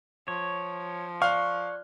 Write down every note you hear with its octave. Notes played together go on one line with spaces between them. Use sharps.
F3 C#5
D5 F5 C#6 F6 F#6